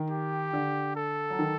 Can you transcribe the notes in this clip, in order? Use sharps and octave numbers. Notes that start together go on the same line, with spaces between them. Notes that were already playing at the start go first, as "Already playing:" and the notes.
Already playing: D#3
G4
D3
A4
F#3
D#3